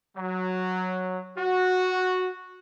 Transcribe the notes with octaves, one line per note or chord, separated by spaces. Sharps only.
F#3
F#4